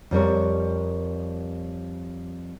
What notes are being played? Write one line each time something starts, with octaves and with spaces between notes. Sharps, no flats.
F2 G3 A#4 C#5